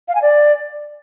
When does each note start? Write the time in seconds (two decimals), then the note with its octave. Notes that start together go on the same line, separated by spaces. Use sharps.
0.08 F5
0.15 G#5
0.22 D5